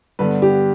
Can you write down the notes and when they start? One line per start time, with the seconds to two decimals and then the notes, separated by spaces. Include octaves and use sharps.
0.19 G2 D3 B3 B4
0.42 G4